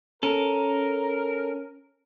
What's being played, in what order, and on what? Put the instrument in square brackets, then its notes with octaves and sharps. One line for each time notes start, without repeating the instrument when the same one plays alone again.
[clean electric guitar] C#4 A4 [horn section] A#4